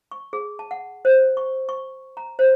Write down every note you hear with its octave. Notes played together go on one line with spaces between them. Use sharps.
C#6
G#4
A5
F#5
C5
C#6
C#6
A#5
C5